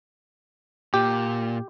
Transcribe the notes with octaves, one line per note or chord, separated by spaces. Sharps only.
A#2 G4